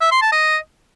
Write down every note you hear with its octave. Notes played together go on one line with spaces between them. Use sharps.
E5
C6
A5
D#5